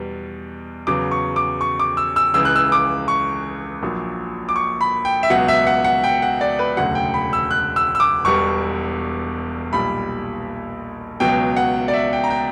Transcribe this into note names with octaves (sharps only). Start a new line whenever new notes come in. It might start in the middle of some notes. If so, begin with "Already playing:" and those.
Already playing: E2 B2 G3
E2 C#3 F#3 D6
C#6
D6
C#6
D6
E6
E6
C#2 C#3 E3 E6
F#6
E6
D6
C#6
A#1 A#2 F#3
D6
C#6
B5
G5
E5
C#2 B2 F#3 F#5
E5
F#5
F#5
G5
F#5
D5
B4
E1 D2 C#3 F#3 F#5
G5
B5
E6
F#6
E6
E6
D6
E1 E2 B2 G3 C#6
B1 A#2 G3 B5
C#2 B2 F#3 G5
F#5
D5
E5
G5
A#5
G5